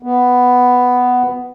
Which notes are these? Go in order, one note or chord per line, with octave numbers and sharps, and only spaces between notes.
B3